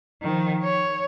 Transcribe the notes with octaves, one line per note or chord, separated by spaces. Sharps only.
D#3 F3
C#5